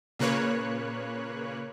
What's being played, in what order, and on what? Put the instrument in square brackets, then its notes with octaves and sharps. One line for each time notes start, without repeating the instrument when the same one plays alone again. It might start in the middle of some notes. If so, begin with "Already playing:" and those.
[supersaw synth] A#2 C#3 A#3 B4 C#5 F#6